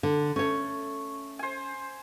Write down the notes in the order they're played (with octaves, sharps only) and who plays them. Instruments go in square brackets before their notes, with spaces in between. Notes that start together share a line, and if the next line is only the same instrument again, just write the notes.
[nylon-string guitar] D3
[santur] A3 [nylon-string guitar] C#4 C#5
[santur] C5 G#5